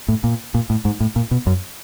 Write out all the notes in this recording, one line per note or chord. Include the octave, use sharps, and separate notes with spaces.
A2
A#2
A#2
A2
G#2
A2
A#2
B2
F#2